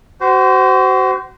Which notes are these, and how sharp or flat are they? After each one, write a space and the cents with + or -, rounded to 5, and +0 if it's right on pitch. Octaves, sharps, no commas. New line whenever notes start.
F#4 +30 C5 -20